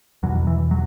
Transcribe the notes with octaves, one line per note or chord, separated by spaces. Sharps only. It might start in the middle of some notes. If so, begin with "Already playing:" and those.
E2 B2 F#3
E3
F#3